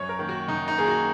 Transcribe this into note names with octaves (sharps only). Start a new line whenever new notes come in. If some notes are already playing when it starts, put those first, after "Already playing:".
Already playing: F#2 C#5
A#4
D#3 A#3
F#4
F#2 D#4
D#4
D#3 A#3 G#4
F#4